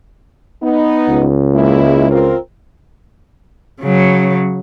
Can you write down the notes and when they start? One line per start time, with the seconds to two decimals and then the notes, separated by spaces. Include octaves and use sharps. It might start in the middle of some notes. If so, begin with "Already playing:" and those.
0.63 B3 D#4
1.09 C#2
1.54 G#3 A#3 E4
2.10 C4 F4 A#4
3.81 C#3 F#3